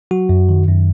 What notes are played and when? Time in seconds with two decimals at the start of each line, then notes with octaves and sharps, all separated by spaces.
0.11 F#3 F#4
0.29 F#2
0.49 D#3
0.68 F#2